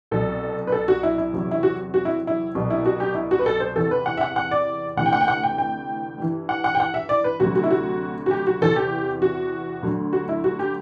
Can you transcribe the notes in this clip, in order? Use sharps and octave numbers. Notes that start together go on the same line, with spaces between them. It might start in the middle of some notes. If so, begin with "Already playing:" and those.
C2 B2 F#3 A4
B4
A4
F#4
E4
E4
E2 C3 F#3
E4
F#4
F#4
E4
E4
C2 B2 F#3
E4
F#4
G4
E4
F#4
B4
A4
C5
E2 C3 E3 A4
B4
F#5
E5
F#5
F#5
D5
D2 C3 E3 F#5
G5
F#5
G5
F#5
G5
G5
G2 E3
F#5
F#5
G5
F#5
E5
D5
B4
D2 C3 F#3 F#4
F#4
E4
F#4
F#4
G4
F#4
E2 C3 E3 A4
G4
F#4
D2 D3 F#3
F#4
E4
F#4
G4